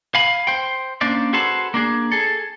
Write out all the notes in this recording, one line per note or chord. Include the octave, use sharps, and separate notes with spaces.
F5 G#5 B5
C5 G5
A#3 C#4 D4 C5 D5
F#4 G#4 A4 B4 C5 A5
A#3 D4 G#4
G#4 A4